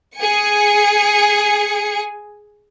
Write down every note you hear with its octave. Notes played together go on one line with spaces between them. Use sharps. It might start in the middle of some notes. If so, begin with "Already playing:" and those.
G#4 G#5 C#7